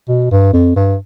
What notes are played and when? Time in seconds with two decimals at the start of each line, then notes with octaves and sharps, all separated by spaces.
0.09 B2
0.31 G2
0.53 F2
0.76 G2